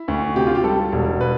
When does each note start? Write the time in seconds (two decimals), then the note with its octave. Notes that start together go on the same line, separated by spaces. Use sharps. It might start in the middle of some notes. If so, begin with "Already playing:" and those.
Already playing: E4
0.08 D2
0.36 C3 G4
0.47 F4
0.55 G4
0.64 G3 A4
0.92 E1
1.21 B4